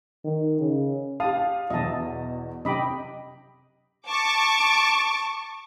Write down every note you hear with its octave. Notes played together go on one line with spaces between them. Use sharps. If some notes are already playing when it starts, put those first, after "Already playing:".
D#3
C#3
G4 F5 A5 D#6
E2 B2 D#5 E5 A5
C3 D#5 G5 B5 D6
A5 C#6 D6